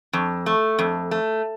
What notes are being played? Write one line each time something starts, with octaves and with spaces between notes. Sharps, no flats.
F2
A3
F2
A3